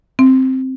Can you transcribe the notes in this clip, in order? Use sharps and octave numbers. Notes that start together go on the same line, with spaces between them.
C4